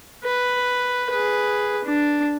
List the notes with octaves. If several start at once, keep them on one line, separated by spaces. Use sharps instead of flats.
B4
G#4 B4
D4